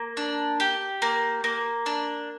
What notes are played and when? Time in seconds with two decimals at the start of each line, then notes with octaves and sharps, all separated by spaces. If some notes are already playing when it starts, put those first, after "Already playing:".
Already playing: A#3
0.17 D4
0.60 G4
1.02 A#3
1.44 A#3
1.86 D4